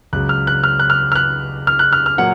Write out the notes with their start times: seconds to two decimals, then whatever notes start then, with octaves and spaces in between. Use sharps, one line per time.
0.13 C#2 C#3 F#3 F#6
0.29 F6
0.47 F#6
0.64 F6
0.80 F#6
0.90 F6
1.12 F6
1.16 F#6
1.67 F6
1.79 F#6
1.93 F6
2.06 F6
2.18 A#2 F#3 A#3 F#5